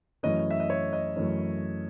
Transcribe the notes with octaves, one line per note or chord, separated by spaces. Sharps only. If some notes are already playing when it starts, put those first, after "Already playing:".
F#2 E3 A3 C#4 D#5
E5
D#5
C#5
D#5
F#2 E3 A3 C#4